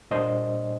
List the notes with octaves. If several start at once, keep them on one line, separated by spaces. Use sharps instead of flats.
A#2 G3 A#3 D4 C5 D#5